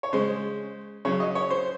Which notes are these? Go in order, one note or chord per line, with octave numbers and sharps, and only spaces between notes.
C#5
C#3 G#3 C5
C#3 F#3 C#5
D#5
C#5
C5